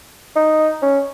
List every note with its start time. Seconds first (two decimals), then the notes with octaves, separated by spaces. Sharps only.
0.36 D#4
0.82 C#4